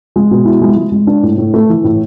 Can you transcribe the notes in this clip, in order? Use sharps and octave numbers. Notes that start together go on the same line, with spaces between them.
G#3
B2
E4
G#3
G#3
G#3
D4
A2
A2
A3
E3
A2